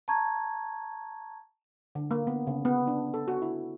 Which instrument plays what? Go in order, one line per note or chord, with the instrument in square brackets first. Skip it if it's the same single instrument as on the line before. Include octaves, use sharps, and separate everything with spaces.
[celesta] A5 A#5 C#6 G#6
[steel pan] D3
A#3
B3
C#3
B3
D4
A4
F#4
E4